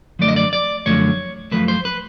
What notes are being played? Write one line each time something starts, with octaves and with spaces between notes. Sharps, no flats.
F#2 D3 F3 A3 D5
D#5
D5
D5
F#2 D3 F3 A3 C#5
F#2 D3 F3 A3 B4
C5
B4